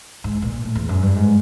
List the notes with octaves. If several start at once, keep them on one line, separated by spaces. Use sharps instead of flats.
G#2
A#2
A2
E2
F#2
G2
G#2